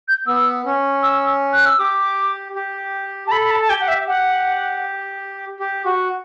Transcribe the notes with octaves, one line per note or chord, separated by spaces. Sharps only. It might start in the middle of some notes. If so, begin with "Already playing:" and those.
G6
B3 E6
C#4
E6
F#6
E6
G4 D6
G4
A5
A4 B5
B5
A5
A5
G4 G5
F#5
E5
G4 F#5
G4
F#4